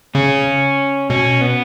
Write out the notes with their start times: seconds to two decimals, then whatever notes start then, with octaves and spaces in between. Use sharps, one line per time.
0.15 C#3 C#4
1.10 B2 C#4
1.41 B3